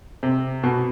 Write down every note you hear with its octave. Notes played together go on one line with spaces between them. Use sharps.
C3
B2